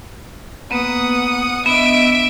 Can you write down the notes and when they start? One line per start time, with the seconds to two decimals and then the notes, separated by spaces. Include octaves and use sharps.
0.71 A#3 B3 B4 F#5 D#6
1.66 B3 D4 D#5 E5 D7